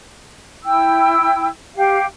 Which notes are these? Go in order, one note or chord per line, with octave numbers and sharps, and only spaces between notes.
E4 G5 E6
G4 F5